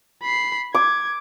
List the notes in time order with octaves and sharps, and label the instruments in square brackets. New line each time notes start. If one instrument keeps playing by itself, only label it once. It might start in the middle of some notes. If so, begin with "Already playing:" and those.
[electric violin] B5 C7
[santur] D6 [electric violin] G#6